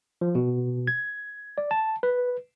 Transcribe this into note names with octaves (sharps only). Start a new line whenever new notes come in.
F3
B2
G#6
D5
A5
B4